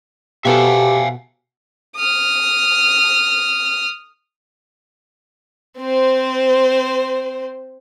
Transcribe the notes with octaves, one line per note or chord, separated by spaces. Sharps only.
B2 B3 G4 A4 E5 F5 G#5
D#6 F6
C4 C5